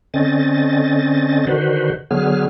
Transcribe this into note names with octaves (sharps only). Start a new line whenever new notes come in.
D3 C4 C#4 D#5 A6
D3 D#3 F#4 B4 C5
D3 F#3 B3 G#4 F6